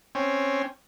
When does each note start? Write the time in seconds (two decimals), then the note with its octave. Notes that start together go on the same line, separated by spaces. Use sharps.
0.15 C4 C#4